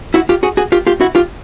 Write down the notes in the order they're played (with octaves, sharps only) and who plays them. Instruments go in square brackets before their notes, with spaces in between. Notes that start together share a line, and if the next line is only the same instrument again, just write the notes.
[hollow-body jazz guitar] E4 F#4
F4 G4
F#4 G#4
F#4 G#4
F4 G4
F4 G4
E4 F#4
F4 G4